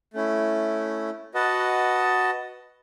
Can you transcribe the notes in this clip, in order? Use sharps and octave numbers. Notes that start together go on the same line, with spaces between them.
A3 C#4 E4
F#4 B4 D#5 F#5 A5